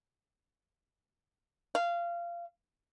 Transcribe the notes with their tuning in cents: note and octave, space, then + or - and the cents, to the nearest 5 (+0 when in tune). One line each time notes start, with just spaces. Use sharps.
F5 -20